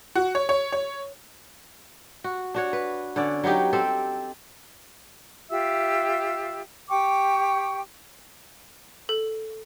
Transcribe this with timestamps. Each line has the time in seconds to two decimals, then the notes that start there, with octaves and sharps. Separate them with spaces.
0.15 F#4
0.35 C#5
0.49 C#5
0.72 C#5
2.24 F#4
2.54 D4 F#4 C#5
2.73 B4
3.16 D3 B3 C#4 D5
3.44 F#3 B3 D#4 G4
3.73 C4 G4 A4
5.50 F4 G4 E5 E6
6.89 G4 G5 C#6 D6
9.09 A4